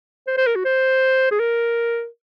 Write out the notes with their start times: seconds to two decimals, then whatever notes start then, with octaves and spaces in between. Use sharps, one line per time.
0.27 C5
0.38 C5
0.47 A#4
0.56 F#4
0.65 C5
1.31 G#4
1.40 A#4